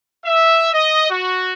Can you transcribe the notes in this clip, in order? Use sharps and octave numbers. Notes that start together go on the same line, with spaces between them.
E5
D#5
F#4